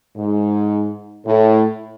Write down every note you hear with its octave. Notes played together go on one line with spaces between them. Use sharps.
G#2
A2